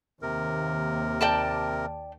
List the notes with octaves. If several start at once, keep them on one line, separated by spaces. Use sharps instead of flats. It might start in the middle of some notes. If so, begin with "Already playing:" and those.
D#2 C3 A#4
D5 G5 A5